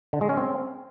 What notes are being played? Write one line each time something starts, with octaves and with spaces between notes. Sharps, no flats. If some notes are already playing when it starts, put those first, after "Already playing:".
D3
G#3
C#4
C4